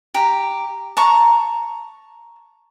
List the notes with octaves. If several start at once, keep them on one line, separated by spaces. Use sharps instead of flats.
G4 A#5
A5 A#5 C#6